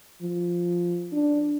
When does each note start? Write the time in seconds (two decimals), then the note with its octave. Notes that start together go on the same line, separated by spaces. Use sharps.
0.22 F3
1.12 D4